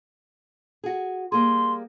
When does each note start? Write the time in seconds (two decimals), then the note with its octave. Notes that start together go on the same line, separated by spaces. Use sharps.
0.84 F#4 G#4
1.32 G3 A#3 G#4 C6